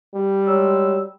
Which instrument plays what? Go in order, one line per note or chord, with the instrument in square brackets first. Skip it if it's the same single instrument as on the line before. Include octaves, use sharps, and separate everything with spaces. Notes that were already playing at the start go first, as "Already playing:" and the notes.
[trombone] G3
[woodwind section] F#3 G#3 E6